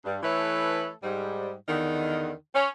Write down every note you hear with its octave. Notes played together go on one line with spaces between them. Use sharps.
G2
E3 A3 A4 B4 C#5
G#2 G3
E2 D3 D#3
C#4